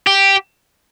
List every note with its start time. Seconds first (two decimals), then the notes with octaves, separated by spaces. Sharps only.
0.07 G4